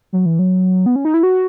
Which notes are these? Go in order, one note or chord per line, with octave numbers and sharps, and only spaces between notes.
F#3
E3
F#3
B3
C#4
D#4
E4
F#4